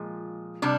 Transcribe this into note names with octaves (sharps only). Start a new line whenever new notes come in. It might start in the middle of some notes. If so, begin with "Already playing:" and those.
Already playing: A#2 F3 G#3
C3 G3 D4